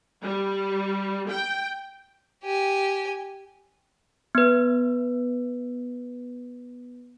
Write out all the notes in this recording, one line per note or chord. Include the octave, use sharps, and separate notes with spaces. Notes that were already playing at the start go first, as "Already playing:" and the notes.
G3
G5
G4 G#5
B3 B4